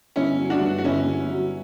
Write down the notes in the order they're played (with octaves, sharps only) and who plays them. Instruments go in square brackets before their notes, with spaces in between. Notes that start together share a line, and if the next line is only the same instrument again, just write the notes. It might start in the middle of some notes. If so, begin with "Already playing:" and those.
[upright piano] G1 [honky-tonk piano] C#4 E4
[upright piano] F#3
[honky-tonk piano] D4 F#4
[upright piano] G2
[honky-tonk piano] F#4
[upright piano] G1 [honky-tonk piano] C#4 E4
[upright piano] G1
F#3